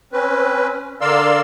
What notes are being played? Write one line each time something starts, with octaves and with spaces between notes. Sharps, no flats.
C4 C#4 B4
D3 A#4 D5 F5 C6 E6